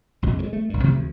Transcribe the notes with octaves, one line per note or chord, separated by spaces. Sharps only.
A#1 F2 C3 G#3
F#3 G#3
A3
B1 G2
C3 E3 F3 A3
D2